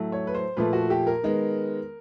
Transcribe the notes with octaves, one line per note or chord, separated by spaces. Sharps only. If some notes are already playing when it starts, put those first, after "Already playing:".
Already playing: A2 F#3 A3
C#5
B4
C5
A#2 F3 A3 B4
F#4
G4
A#4
D#3 G#3 B3